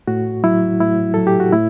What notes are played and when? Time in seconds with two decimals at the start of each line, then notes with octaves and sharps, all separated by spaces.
0.07 A2 F#4
0.44 F#3 E4
0.80 A2 E4
1.14 F#3 A4
1.27 G4
1.40 F#4
1.52 A2 E4